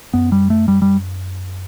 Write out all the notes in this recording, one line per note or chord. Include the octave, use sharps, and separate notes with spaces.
F#2 B3
G3
A3
G3
G3